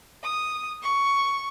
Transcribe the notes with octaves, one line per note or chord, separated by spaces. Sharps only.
D#6
C#6